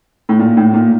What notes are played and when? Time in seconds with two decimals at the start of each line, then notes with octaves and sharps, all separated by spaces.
0.29 A2
0.39 A#2
0.57 A2
0.74 A#2